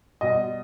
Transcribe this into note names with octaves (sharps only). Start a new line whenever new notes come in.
B2 G3 D#5